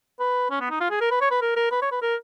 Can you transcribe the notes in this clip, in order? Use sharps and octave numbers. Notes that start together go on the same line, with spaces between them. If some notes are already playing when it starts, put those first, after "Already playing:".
B4
C#4
B3
D#4
F4
G#4
A#4
B4
C#5
B4
A#4
A#4
B4
C#5
B4
A#4